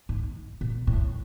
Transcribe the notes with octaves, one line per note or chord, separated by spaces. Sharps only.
G#2
A#2
A2